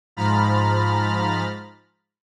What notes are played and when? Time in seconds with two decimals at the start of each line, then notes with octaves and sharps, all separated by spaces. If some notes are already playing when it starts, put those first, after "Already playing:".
0.17 G#2 F3 A#5 B5 F6 A6